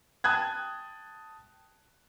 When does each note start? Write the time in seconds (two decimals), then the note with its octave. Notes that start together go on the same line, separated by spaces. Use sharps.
0.24 G5 A5 D#6 F#6 G#6